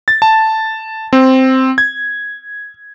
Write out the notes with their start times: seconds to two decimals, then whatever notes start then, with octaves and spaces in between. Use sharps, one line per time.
0.08 A6
0.22 A5
1.13 C4
1.78 G#6